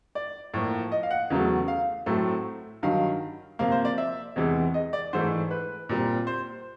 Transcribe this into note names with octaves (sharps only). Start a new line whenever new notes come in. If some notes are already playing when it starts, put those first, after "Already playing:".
D5
A2 F3 A#3
D#5
F5
F#5
E2 C#3 F#3 A3
F5
A2 F#3 A3 C4
G2 D#3 F#3 F5
C3 F3 A#3 F5
C5
D5
E5
E2 C3 E3 G#3
D#5
D5
G#2 E3 A3 C5
B4
A#2 G3 C4
C5